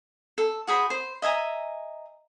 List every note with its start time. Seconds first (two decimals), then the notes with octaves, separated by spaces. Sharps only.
0.38 A4
0.67 F#4 G#4 C5 B5
0.90 C5
1.22 D#5 E5 G#5 A#5